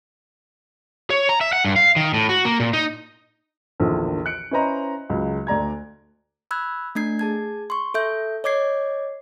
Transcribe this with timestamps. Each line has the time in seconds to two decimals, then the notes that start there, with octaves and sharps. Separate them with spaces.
1.10 C#5
1.29 A#5
1.41 E5
1.53 F#5
1.65 G2
1.76 F5
1.96 D#3
2.14 A2
2.29 F#4
2.45 A#3
2.60 A#2
2.73 D#4
3.80 A#1 E2 D3 D#3 F3
4.26 F#6 C#7 D7
4.51 C#4 E4 B4 C5 D#5 A#5
5.10 C#2 C#3 F#3
5.47 D2 D5 A#5 G#6
6.51 B5 E6 F#6 G#6
6.95 A3 D4 G#6 C7
7.19 G#4 A5 G#6
7.70 C6 C#6
7.94 A4 E5 G6
8.44 C#5 D#5 D6 G#6 C7